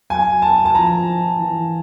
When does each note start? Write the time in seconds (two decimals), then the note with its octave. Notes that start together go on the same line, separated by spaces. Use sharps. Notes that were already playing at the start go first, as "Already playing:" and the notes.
0.10 F#3 G#5
0.42 A5
0.65 A5
0.75 F3 A#5
1.40 E3